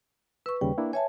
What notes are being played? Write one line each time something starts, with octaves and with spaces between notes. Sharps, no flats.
B4 C#6 E6
D#2 C#3 G3 G5
A#3 D4 E4
C#5 E5 G#5 A5